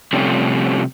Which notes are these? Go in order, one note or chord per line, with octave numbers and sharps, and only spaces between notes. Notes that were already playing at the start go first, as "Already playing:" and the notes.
C3 F3 G3 A3 C#4